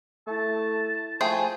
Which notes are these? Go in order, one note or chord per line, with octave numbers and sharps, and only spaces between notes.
A3 E4 A5
F3 A3 G#4 G5 G#5